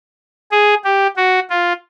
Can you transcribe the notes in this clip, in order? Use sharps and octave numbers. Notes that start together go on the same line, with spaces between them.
G#4
G4
F#4
F4